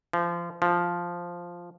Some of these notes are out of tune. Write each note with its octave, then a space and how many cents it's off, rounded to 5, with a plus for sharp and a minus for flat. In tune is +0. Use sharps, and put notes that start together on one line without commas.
F3 -25
F3 +0